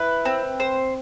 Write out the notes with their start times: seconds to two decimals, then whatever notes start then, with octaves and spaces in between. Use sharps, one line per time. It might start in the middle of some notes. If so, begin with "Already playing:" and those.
Already playing: E4 B4
0.25 C4
0.60 C5